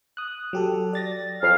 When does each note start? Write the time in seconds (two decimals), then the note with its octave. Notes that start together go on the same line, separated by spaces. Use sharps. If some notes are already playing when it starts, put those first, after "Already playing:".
0.17 D#6 F#6
0.53 F#3 G4 A4
0.93 D5 A6 A#6
1.42 F2 F5